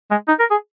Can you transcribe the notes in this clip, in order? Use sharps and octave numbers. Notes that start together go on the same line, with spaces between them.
G#3
D#4
A#4
G#4